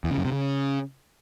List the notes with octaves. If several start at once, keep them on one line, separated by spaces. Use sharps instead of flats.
E2
C#3
F#2
C3
C#3